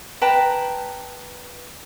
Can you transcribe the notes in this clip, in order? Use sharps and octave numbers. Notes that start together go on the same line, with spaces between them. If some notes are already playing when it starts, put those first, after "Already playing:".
B4 G5 A5 A#5